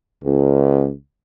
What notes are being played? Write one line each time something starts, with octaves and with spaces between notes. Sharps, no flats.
C#2